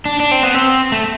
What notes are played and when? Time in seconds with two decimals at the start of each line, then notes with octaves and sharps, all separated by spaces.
0.05 D4
0.20 D4
0.31 C4
0.43 B3
0.54 C4
0.92 A3